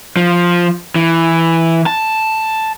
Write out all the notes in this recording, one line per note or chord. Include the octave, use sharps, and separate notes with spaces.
F3
E3
A5